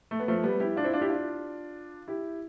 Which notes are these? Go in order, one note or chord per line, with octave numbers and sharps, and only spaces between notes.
A3
B3
F3 A3
G3 B3
E4 G4
D4 F4
C4 E4
D4 F4
E4 G4
D4 F4
E4 G4